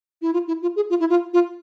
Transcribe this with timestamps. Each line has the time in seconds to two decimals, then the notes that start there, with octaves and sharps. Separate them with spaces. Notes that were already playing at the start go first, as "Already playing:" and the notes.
0.22 E4
0.33 F4
0.47 E4
0.62 F4
0.76 G#4
0.90 F4
1.00 E4
1.10 F4
1.33 F4